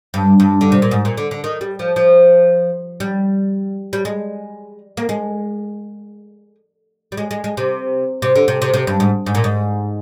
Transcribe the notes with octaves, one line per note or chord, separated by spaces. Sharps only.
G2
G2
D3
C3
A#2
G#2
A#2
D3
D3
D#3
G3
F3
F3
G3
G3
G#3
A#3
G#3
G3
G#3
G#3
G#3
C3
C3
D3
C3
C3
C3
G2
G#2
G#2
A#2
G#2